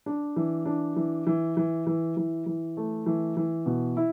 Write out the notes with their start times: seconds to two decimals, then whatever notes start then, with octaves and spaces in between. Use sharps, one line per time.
0.06 D4
0.36 E3
0.66 D4
0.96 E3
1.27 E3
1.57 E3
1.87 E3
2.17 E3
2.46 E3
2.77 A3
3.06 E3
3.37 E3
3.66 B2
3.97 E4